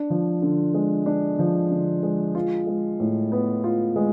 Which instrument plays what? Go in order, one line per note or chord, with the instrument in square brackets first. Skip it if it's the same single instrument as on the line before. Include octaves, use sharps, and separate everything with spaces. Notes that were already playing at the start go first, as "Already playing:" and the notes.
Already playing: [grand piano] D4
F3
D3
G#3
D4
F3
D3
G#3
F4
G#3
A2
B3
F4
G#3